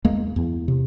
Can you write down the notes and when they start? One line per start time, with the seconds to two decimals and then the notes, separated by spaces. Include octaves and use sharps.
0.05 E2 G#3 A#3
0.36 E2
0.68 C3